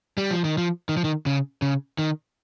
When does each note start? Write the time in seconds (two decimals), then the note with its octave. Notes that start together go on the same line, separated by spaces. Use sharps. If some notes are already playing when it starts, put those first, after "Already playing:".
0.18 G3
0.31 F3
0.44 D#3
0.58 F3
0.89 D#3
0.97 F3
1.04 D#3
1.26 C#3
1.62 C#3
1.99 D#3